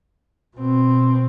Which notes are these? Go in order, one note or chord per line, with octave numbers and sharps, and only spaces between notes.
B2 C4